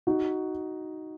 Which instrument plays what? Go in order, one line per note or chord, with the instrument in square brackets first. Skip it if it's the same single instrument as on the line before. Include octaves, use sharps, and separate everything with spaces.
[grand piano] D#4 F#4